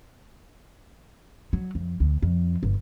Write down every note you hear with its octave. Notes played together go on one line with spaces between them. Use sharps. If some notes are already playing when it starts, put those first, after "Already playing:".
F#3
F2
D2
F2
G1